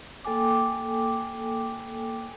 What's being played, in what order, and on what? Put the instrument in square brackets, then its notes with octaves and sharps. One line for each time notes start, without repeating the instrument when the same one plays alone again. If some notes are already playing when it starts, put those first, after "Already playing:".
[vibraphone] A#3 A4 G5 G#5 D6